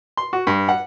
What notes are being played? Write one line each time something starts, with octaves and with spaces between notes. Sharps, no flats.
C6
F#4
G2
F#5